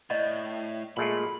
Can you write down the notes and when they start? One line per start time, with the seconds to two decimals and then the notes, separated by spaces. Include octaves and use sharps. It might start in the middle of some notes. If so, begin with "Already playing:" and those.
0.10 A2 D5 D#5
0.97 A#2 G#3 A3 B5